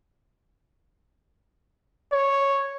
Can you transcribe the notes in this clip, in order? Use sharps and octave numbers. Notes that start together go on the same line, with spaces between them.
C#5